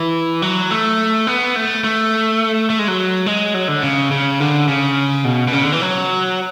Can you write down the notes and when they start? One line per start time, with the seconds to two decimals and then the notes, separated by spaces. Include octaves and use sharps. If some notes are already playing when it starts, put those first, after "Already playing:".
Already playing: E3
0.42 F#3
0.71 A3
1.27 B3
1.56 A3
1.84 A3
2.70 A3
2.79 G#3
2.88 F#3
3.26 G#3
3.54 F#3
3.68 D3
3.83 C#3
4.11 C#3
4.40 D3
4.68 C#3
5.25 B2
5.48 B2
5.53 C#3
5.63 D3
5.72 E3
5.82 F#3